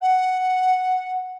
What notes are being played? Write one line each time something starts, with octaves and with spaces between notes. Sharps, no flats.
F#5